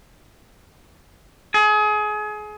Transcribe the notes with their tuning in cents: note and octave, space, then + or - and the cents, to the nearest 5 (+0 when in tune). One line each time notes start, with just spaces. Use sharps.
G#4 +30